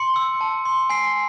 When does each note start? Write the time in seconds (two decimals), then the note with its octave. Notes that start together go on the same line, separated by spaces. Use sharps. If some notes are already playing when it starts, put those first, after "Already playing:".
Already playing: C6 C#7
0.16 E6
0.41 A5
0.65 C6
0.90 G#5 C7